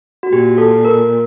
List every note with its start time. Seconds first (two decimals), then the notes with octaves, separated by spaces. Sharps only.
0.23 F#4
0.32 A#2 G4
0.58 A4
0.85 A#4